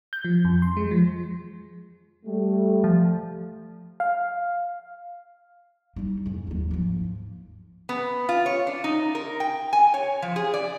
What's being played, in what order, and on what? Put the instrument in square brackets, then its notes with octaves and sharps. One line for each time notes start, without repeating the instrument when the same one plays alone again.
[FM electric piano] G6
F3
F2
C6
G#3
F3
[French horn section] G3 A3
[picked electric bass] F3
[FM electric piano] F5
[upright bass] G3 D#4
F2 G#2
D#2 F#3
G#2 F3
[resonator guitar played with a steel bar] B3
F4
C#5
D4
D#4
A#4
G5
G#5
C#5
F3
G#4
D5